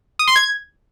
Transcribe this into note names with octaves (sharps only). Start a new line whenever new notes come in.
D#6
C6
G#6